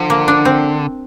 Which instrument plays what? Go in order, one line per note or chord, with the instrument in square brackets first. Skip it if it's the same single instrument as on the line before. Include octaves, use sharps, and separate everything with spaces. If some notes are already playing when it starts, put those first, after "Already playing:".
Already playing: [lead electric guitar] D3 [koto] F3
[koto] A#3
D4
C4